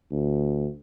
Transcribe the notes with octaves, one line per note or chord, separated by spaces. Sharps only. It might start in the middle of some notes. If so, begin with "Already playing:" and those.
D2